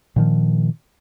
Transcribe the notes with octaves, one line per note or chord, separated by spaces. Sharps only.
A#2 D#3 F3